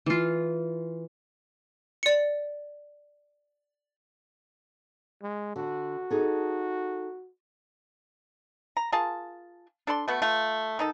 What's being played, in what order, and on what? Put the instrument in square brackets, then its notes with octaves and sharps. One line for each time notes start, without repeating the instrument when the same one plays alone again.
[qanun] E3 F4
[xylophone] D5 C#7
[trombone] G#3
[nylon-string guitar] D3 [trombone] F#4
[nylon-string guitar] D#4 G#4 A4
[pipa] A#5
F4 G#4 A#4 A5
D4 A4 D5 C6
A3 B3 F#4
A3 F4
D#3 D#4 A4